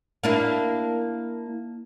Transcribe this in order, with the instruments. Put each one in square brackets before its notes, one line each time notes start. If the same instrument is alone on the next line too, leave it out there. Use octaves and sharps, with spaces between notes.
[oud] A#3 D4 E4